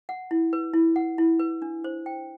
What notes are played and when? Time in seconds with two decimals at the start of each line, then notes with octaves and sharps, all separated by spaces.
0.09 F#5
0.31 E4
0.53 B4
0.74 E4
0.96 F#5
1.18 E4
1.39 B4
1.62 D4
1.84 C5
2.06 G5